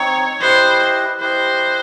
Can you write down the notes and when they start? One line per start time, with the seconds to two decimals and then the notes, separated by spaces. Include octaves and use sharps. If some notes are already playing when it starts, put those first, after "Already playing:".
Already playing: C4 D#4 C#5
0.41 E4 G4 B4 C5 D#5
1.21 E4 G4 B4 C5 D#5